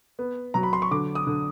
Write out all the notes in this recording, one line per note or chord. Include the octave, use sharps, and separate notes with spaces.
B3
F#3 A#5
B5
C6
C#6
D3 D6
D#6
D3